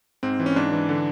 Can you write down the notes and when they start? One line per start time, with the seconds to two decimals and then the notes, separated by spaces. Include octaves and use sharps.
0.23 G#2 C4
0.40 E3
0.46 C#4
0.56 G#2 D4
0.73 E3
0.89 D3